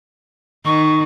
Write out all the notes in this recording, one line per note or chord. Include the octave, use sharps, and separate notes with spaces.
D#3 C#6